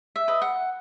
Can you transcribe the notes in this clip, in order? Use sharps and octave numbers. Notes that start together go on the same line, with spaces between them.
E5
B4 D#5
F#5